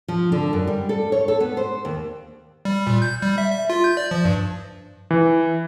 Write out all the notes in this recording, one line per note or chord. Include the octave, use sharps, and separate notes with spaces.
F3
D3
F#2
G3
A4
C#5
A4
B3
C5
D#2
G3
A#2
G6
G3
E5
E5
F4
G6
D5
F3
G2
E3